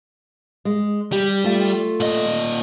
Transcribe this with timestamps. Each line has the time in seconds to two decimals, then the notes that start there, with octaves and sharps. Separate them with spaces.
0.65 G#3
1.12 G3 G4
1.44 A3 F4
2.00 A#2 D#5